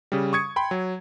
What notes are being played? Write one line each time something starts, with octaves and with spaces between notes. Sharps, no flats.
C#3 G3
C#6 D#6 G#6 C#7
G5 B5 C6
F#3